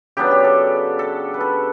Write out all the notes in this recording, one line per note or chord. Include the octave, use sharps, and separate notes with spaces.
C#3 F#3 B3 D4 G4
G4
A4
A4
B4
A4